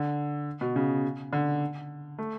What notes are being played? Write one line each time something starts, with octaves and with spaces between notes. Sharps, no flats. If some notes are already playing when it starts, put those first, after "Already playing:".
Already playing: D3
B2
C#3
D3
A3